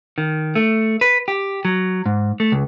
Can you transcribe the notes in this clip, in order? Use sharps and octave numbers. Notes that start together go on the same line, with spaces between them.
D#3
A3
B4
G4
F#3
G#2
A3
C#2